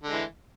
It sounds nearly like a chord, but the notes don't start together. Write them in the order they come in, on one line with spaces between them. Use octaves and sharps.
D3 G#3 E3